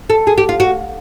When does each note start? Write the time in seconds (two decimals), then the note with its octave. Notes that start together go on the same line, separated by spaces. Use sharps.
0.10 A4
0.27 G#4
0.38 G4
0.49 F4
0.60 F#4